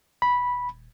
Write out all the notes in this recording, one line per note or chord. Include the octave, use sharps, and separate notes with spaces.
D#1 B5